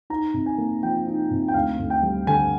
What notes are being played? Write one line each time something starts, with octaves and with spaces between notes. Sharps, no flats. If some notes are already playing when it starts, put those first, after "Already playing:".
D#4 A#5
C3
G#5
A#3
F3 G5
D#4
C3
G5
D2 F5
D2
G5
G3
D3 G#5